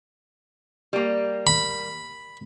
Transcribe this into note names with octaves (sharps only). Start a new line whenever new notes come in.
G3 A#3
B5